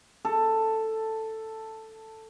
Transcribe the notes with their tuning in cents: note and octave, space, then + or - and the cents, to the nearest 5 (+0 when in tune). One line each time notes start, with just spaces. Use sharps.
A4 +5